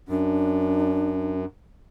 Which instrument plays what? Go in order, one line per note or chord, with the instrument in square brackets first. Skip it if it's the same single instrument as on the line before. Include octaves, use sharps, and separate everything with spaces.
[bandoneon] F#2 [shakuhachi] D4